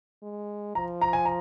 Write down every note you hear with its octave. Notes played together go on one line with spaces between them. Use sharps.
G#3
F3 A#5
A#5
G#5
A#5